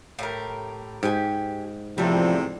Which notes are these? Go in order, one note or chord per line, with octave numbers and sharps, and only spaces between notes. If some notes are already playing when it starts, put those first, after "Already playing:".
A2 G4 A#4
G#2 G4 G#5
E2 A2 C3 F3 G3 A4